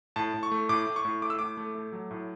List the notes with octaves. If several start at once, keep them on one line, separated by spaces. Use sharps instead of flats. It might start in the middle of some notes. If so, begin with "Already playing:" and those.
A2 A5
A2
C#6
A3
A2 D6
A2
C#6
A2
A3 D6
E6
A2 D6
A3
A3
F#3
A2